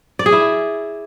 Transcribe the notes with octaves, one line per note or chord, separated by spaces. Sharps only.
D5
G#4
E4